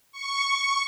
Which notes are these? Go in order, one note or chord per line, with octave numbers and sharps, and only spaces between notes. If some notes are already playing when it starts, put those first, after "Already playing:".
C#6